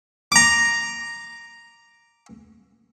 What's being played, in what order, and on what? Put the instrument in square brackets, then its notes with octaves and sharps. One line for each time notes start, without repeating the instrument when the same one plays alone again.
[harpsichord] A#5 D6